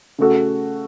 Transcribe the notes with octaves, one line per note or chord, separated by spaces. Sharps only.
C#3 A3 F#4 A4